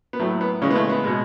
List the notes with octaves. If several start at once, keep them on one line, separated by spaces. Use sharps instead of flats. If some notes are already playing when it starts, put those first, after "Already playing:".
B3
A2 F#3 A3
B3
C#3 E3 G#3 C#4
B3
A3
B3
B2 G#3